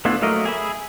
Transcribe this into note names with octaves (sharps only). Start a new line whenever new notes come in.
A3 B3 D4 E4 F4
F#3 A3 A#3 A#4 D#5
G#4 E5 B5